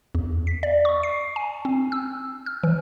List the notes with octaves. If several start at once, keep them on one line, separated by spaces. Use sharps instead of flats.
E2
B6
D5
C#6
C7
G#5
C4
E6
F6
E3